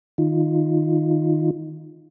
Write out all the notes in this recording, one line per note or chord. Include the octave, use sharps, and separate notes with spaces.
D#3 D#4 F4